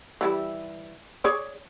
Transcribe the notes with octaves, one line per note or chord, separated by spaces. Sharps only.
E3 G3 E4
G#4 C#5 D5